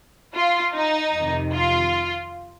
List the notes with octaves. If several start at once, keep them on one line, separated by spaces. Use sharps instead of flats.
F4
D#4
F2 C3 D#3
F4